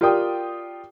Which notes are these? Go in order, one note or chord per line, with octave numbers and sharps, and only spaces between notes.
F4 G4 A#4 D5 G5 D#6